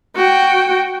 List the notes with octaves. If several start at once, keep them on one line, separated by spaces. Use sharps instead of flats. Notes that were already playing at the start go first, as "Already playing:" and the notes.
F#4 G5